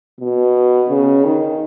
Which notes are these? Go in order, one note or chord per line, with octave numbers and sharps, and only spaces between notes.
B2
C#3
D#3